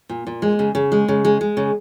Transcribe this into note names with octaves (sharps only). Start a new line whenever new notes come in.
A#2
A#2
G#3
C#3
C#3
G#3
C#3
G#3
G#3
C#3